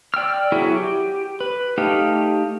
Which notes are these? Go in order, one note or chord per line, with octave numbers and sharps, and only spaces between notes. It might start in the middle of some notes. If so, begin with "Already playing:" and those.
D5 G5 E6 F6
F#3 B3 E4 F#4 G#4
G4
B4
A3 D#4 G4 A4 F5